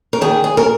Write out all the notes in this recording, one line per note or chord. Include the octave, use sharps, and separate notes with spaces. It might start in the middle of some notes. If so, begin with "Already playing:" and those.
A#4
D#3 G#4
G#4
A#4